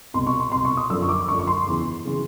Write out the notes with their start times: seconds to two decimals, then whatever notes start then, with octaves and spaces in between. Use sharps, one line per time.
0.14 C2 B2 C6
0.27 C#6
0.40 C6
0.52 C2 B2 C6
0.65 C#6
0.77 D#6
0.90 F#2 D3 F3 E6
1.03 C#6
1.09 D6
1.28 F#2 D3 F3 C#6
1.39 C#6
1.47 C6
1.66 E2 C#3 E3
2.05 C#3 E3